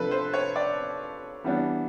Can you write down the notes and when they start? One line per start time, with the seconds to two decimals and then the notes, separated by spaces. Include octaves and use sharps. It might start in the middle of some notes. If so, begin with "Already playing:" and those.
Already playing: C3 F3 A3 D4 A4 B4
0.11 C5
0.33 C#5
0.56 D5
1.44 E3 G3 B3 D4